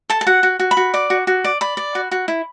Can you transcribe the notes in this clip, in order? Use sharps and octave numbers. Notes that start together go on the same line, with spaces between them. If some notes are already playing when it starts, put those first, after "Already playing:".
A4 A5
A5
F#4 F#5
F#4
F#4
B5
F#4
D5 D6
F#4
F#4
D5
D5 B5
D5
F#4
F#4
E4